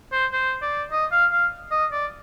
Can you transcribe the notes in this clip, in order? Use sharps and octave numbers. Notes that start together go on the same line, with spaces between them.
C5
C5
D5
D#5
F5
F5
D#5
D5